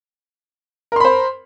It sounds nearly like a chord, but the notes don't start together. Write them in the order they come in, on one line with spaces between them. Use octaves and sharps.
A#4 C6 B5 C5